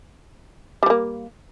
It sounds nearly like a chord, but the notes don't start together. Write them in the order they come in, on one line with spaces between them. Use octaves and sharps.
G3 F3 A#3